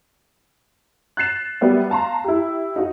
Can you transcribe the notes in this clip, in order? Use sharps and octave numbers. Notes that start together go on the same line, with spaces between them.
F#6 A6 C7 E7
F#3 G3 B3 D5 E5
F5 A5 A#5 C6
E4 G4
D#4 F#4 D#5